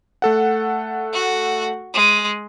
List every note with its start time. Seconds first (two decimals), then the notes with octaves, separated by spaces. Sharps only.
0.22 A3 A4 F#5
1.13 F#4
1.94 G#3